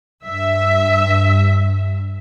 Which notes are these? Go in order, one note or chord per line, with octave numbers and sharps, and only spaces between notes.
G2 E5